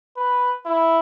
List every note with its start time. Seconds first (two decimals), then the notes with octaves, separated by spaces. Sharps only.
0.17 B4
0.66 E4